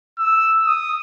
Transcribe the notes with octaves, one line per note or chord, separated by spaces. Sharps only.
E6
D#6